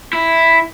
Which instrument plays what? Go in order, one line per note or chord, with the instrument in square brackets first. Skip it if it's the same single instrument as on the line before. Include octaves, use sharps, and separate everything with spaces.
[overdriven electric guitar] E4